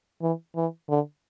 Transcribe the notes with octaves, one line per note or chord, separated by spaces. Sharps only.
E3
E3
D3